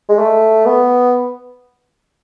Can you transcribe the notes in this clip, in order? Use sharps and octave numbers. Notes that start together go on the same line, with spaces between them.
G#3
A3
B3